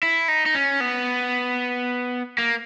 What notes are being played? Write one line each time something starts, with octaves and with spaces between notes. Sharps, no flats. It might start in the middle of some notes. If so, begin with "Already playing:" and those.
E4
D#4
D#4
C#4
B3
A#3